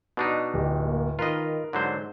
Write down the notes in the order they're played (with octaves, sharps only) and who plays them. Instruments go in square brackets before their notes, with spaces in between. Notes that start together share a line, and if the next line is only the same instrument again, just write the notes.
[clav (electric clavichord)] B2 D4 D#4 [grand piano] F#4
[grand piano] D1 [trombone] G4
[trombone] A#3
[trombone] D#3 [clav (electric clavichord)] F4 B4 D#5 [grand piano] A#4
[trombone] G#2 [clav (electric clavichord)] D3 F#3 C5